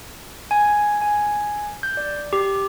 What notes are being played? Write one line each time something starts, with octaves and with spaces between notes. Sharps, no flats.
G#5
G#5
G6
D5
G4